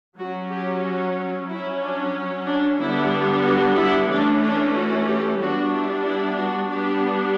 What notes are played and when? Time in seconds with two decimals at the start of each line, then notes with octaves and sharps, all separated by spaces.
0.18 F#3 C#4 F#4
0.51 G4
0.83 F#4
1.48 F#3 C#4 E4
1.82 D4
2.47 D4
2.80 D3 G3 B3 D4 E4
3.44 F#4
3.77 E4
4.09 E3 A3 C#4 D4
4.42 D4
4.75 F#4
5.07 G4
5.40 G3 B3 D4 F#4
5.73 E4
6.05 E4
6.37 F#4
6.70 G3 B3 D4 G4